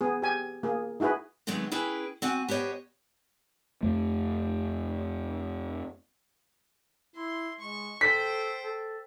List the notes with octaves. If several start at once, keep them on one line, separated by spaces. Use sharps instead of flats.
B3 G#4
G4 G#5
A#3 G#4
D#4 E4 F#4 G#4 B4
D#3 F#3 G#3 A3 B3 C4
C#4 E4 G#4 B4 G5
C4 F#4 F#5 G#5
B3 G4 C5 C#5 D#5
F2 A3
E4 C6
G#3 C#6
A4 C5 G5 B6
A4